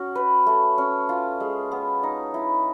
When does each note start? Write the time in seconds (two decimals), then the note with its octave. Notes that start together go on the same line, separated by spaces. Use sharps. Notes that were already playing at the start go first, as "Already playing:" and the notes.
Already playing: C#4 F#4
0.15 B4
0.46 A3
0.78 C#4
1.09 F4
1.40 G#3
1.71 B3
2.03 D#4
2.34 E4